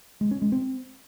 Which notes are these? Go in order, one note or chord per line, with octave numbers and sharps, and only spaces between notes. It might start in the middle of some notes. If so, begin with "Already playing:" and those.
G#3
C#4
G#3
C4